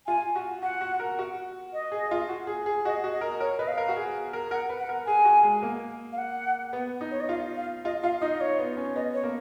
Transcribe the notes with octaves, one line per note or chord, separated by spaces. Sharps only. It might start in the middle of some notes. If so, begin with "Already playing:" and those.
F4 G#5
F#4
F#4 F#5
F#4
A#4
F#4
D#5
G#4
F4
F#4
G#4
G#4
F#4 D#5
F#4
D#5
A#4
A#4 C#5
B4 D#5
F5
A#4
F#4
G#4
A#4
A#4 F#5
B4
F#5
A#4
G#4 G#5
F#4
G#3
A#3
F5
F#5
B3
D#4
C#5
D#5
F4 F5
F5
F4 D#5
F4 F5
D#4 D#5
D#5
C#5
B3
C#4
B3 D#5
C#5
A#3